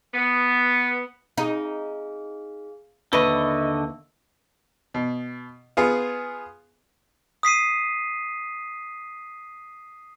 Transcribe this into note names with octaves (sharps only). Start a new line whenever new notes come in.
B3
D#4 G#4 F5
D#2 D3 B4 D#5 E5 C#6 E6
B2
B3 F4 G#4
D#6 B6 C7 D#7